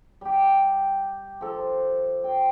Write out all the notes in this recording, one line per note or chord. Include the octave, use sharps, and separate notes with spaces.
G3 G4
F3 A4
G5